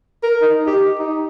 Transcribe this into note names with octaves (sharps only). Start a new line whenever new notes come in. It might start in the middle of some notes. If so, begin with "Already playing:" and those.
A#4
D#4
G4
D#4